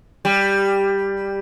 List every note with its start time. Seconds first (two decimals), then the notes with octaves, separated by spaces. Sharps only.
0.25 G3